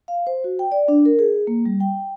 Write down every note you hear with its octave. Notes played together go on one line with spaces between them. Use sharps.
F5
C5
F#4
G5
D5
D4
A#4
G#4
A#3
G3
G5